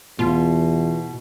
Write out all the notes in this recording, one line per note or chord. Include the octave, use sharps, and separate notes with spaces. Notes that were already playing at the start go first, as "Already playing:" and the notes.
E2 B2 F4